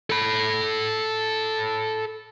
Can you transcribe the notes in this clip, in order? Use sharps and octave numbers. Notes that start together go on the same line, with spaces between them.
A4 B5